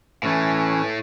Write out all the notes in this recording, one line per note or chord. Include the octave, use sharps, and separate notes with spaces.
A2 E3 A3 C#4